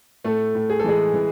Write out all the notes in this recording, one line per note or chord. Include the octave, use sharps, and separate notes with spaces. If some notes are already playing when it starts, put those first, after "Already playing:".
A2 A3 A4
A2
G#4
A4
E3 G#3 G#4
E3